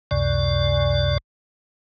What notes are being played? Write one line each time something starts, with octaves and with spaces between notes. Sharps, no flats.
C#2 F#2 C3 D5